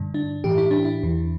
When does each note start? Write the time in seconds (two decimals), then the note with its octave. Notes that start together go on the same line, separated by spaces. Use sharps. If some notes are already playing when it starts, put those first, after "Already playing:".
Already playing: G2 D3
0.14 D4
0.44 A2 E3 G4
0.58 E4
0.71 D4
0.85 E4
1.03 E2 E3